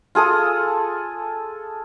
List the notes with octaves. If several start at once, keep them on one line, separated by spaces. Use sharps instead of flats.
F4 G#4 A4 D#6